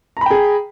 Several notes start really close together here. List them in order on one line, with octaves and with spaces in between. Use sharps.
A#5 B5 G5 G#4